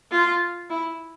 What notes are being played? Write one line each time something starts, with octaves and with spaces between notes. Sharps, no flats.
F4
E4